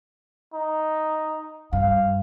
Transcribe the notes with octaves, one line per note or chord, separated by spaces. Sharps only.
D#4
G2 F5